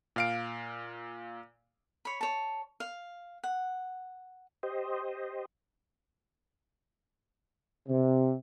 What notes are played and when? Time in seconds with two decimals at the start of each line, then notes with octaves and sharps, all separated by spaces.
0.16 A#2 F5 D7
2.05 C#5 B5
2.21 C#5 A5
2.80 F5
3.44 F#5
4.63 G4 C5 D#5
7.88 C3